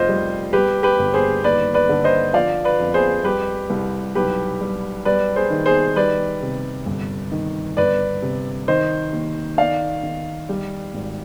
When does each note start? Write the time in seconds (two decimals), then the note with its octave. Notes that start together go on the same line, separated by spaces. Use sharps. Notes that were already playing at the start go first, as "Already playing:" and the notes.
Already playing: F1 F4 C5 D#5
0.09 G3
0.53 G3 G4 B4
0.83 G4 B4
0.99 G1
1.14 G#4 C5
1.44 D#2 B4 D5
1.74 B4 D5
1.89 D3
2.04 C5 D#5
2.34 F3 D5 F5
2.65 B4 D5
2.80 F2
2.94 G#4 C5
3.24 G3 G4 B4
3.70 C2
4.15 B1 G4 B4
4.61 G3
5.05 G3 B4 D5
5.36 G#4 C5
5.51 D#3
5.66 G#4 C5
5.96 G3 B4 D5
6.42 C3
6.86 G1
7.32 D#3
7.77 G1 B4 D5
8.22 C3
8.68 D#3 C5 D#5
9.13 D#2
9.58 D#3 D5 F5
10.03 D#3
10.49 G3
10.94 G#1